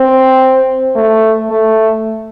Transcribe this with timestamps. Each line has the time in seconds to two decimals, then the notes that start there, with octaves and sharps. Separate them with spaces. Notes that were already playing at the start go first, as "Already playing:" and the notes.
Already playing: C4
0.96 A3
1.50 A3